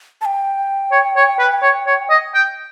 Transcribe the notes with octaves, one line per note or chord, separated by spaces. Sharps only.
A5
G5
C#5
C#5
B4
C#5
C#5
D#5
G5